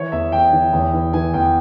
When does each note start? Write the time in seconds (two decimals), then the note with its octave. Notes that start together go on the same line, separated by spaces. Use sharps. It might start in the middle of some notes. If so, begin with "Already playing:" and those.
Already playing: E3 C#5
0.12 E2 E5
0.32 E2 G5
0.52 E3
0.73 E2
0.93 E3
1.13 E3 G#5
1.34 E2 G5